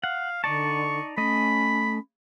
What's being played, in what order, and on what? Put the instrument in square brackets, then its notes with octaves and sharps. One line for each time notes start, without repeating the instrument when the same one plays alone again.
[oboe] F5 [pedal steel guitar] F#5
[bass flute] D3 [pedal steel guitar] D#4 D5 A5 [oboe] C#6
[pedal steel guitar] A3 D#5 [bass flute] C#4 [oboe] B5